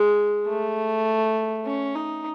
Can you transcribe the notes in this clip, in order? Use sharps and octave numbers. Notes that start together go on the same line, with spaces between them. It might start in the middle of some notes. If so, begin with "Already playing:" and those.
Already playing: G#3
A3
C#4
D#4